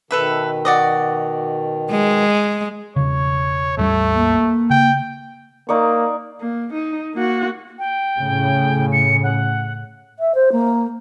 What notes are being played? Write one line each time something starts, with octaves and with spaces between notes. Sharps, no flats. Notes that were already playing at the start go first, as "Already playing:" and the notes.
B2 D#3 A4 B4 E5
F#4 D5 D#5
G#3
E1 C#3 C#5
A1 E2 G3 A3
A#3
C#3 G5
A#3 D#4 D5 C#6
A#3
D#4
A#3 F#4
G5
A2 C#3
C#7
F#5
E5
C5
A#3